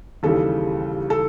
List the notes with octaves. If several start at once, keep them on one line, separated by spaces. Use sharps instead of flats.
D#2 C#3 E3 G3 A4
A4